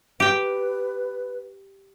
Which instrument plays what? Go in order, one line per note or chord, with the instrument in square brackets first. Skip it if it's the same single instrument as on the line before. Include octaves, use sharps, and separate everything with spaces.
[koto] G4 G5 [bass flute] B4